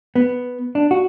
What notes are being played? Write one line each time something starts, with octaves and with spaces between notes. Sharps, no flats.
B3
D4
F#4